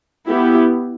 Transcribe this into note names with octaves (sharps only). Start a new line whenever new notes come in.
B3 E4 G4